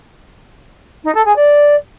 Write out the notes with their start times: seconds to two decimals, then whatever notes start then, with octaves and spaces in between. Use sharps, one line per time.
1.04 D#4
1.14 A4
1.25 G#4
1.36 D5